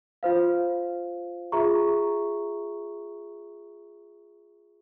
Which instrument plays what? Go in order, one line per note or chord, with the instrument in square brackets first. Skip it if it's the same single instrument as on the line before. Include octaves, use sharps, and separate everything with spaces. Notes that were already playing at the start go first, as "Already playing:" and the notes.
[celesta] F4 C5 F5
F4 G#4 E5 A#5 C#6